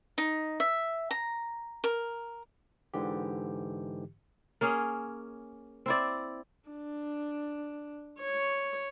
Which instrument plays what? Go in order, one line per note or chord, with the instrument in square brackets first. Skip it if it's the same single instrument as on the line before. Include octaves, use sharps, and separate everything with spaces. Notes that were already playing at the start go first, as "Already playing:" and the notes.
[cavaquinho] D#4
E5
A#5
A#4
[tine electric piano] G#2 D3 E3 G4
[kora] A#3 C#4 G#4
C4 E4 D5
[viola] D4
C#5